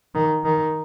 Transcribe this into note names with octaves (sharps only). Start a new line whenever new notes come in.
D#3
D#3